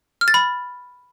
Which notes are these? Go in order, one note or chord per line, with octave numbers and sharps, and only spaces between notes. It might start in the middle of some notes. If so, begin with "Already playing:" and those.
F6
A6
B5